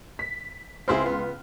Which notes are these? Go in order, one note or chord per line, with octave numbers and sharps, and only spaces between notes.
B6
C#2 C4 E4 G#4 C6 F6
B3